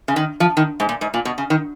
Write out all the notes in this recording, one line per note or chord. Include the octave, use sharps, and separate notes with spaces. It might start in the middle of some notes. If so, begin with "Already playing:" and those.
C#3
D#3
F3
D#3
G#2
A#2
G#2
A#2
B2
C#3
D#3